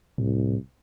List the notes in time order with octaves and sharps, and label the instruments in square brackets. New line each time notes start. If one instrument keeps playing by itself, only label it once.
[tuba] C2 [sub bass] A2